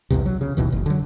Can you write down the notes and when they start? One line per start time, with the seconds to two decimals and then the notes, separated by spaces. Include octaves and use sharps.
0.10 B1 E2 G2 C3
0.26 F#3
0.41 C#3
0.57 G1 D#2 B2 E3
0.72 F#1
0.86 D3 F#3